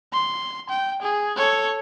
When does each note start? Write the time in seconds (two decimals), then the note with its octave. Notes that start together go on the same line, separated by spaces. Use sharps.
0.13 C6
0.70 G5
1.02 G#4
1.36 A4 C#5